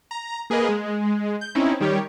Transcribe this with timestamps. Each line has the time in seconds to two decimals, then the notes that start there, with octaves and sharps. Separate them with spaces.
0.11 A#5
0.50 A#3 G#4 A#4 B4 D#5
0.69 G#3
1.41 G6
1.55 C4 C#4 D#4 E4
1.80 D#3 G3 G4 C#5